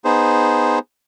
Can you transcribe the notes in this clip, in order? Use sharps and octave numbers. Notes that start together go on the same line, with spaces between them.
B3 D#4 G#4 C5